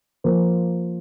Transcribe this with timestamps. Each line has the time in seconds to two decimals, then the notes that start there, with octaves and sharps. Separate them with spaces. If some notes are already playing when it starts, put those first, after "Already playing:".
0.24 F3 A#3